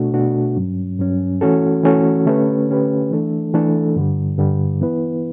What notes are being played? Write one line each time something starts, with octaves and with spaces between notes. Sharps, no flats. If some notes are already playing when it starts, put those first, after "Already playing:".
Already playing: B2 A3 D4 F#4
B2 A3 D4 F#4
G2 F#3 C#4
G2 F#3 C#4
E3 A3 C#4 F#4 A4
E3 A3 C#4 F#4 A4
D3 A3 C#4 G4 B4
D3 A3 C#4 G4 B4
E3 A3 D4 A4
E3 A3 D4 A4
G2 D3 G3
G2 D3 G3
E3 B3 E4 B4